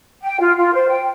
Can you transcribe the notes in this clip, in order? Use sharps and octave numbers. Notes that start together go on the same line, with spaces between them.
G5
F4
F4
C5
G5